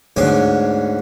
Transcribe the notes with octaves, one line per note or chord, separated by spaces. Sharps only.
D2 G#2 B3 C#4 G#5 D6